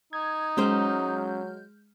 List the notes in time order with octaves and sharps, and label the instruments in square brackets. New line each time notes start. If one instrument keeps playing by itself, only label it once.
[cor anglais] D#4 [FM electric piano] G#6
[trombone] F#3 [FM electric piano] G#3 F6 G6 [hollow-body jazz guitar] C#4 C5